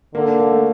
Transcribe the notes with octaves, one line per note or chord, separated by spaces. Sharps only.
D3 A#3
A#3
A#3
A3